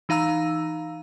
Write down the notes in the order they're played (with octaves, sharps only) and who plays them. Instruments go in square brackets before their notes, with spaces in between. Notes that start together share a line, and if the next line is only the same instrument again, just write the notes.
[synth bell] E3 D#4 F5 A#5 E6